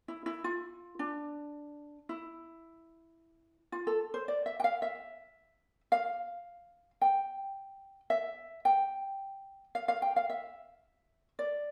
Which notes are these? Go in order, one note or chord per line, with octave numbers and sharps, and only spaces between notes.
E4
E4
F4
D4
E4
F4
A4
C5
D5
E5
G5
F5
E5
F5
G5
E5
G5
F5
F5
G5
F5
E5
D5